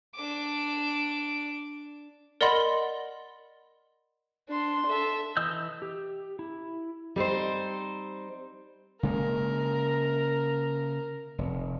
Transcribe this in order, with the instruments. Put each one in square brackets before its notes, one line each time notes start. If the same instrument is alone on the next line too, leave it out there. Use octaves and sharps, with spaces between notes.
[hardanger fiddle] D4 D6
[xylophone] A#4 D5 D#5 F#5 B5 C6
[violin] D4 C6
A4 E5
[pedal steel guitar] E3 D#5 D#6 E6 G6
G4
E4
[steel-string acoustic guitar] G3 C4 D#4 C5
[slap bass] C#3 G#3 A#3 [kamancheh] A#4
[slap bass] F1